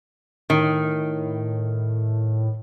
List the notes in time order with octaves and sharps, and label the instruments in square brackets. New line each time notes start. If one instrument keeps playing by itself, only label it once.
[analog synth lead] A2 [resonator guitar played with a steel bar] D#3